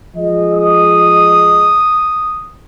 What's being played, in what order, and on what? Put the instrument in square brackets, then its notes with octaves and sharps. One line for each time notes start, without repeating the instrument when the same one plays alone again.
[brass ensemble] F3 G#3 D#5
[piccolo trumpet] D#6